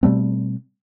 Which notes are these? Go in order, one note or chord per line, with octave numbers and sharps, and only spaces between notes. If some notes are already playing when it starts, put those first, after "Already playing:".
B2 G3 A3 C4